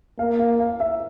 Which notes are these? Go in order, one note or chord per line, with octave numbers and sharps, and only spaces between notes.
A#3 F5
F5
F5
E5